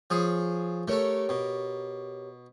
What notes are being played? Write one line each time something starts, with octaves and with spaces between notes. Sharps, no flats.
F3 G#4 C#5
A3 G4 A4 A#4 C#5
B2